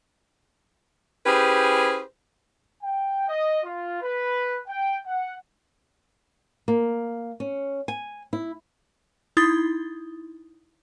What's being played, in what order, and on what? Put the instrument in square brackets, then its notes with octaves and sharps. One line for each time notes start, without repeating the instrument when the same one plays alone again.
[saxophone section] C#4 E4 G4 G#4 B4 C5
[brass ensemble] G5
D#5
F4
B4
G5
F#5
[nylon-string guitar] A#3
C#4
G#5
E4
[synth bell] D#4 E4 D#6 A6 G7